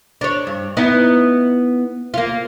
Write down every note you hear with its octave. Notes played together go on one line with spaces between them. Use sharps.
D4 C#5
G2
B3 D#4 E4
A#3 F4